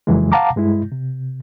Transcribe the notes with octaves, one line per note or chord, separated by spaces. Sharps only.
F2 C#3 E3 F#3 G#3
F5 F#5 A5 A#5 D6
G2 G#3 E4
C3